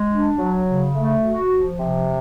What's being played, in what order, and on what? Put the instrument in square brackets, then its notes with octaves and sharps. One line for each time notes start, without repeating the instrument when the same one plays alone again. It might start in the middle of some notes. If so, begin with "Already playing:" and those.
Already playing: [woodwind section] G#3
D4
F#3
C#3
A3
F#4
F3
C3